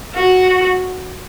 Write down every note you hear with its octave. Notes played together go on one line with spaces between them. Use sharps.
F#4